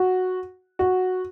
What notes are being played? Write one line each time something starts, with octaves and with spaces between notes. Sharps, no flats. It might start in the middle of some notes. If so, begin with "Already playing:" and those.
Already playing: F#4
F#4